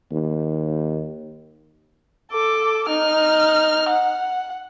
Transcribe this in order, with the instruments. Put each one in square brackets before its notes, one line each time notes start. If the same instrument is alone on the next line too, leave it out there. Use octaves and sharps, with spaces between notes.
[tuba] D#2
[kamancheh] A4 D6
D#4 F6
F#5